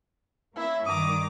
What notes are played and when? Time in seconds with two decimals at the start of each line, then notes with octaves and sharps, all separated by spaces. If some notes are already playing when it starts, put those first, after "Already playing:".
0.56 A#3 C#4 E4 E5
0.86 G2 D#3 A#5 D6 D#6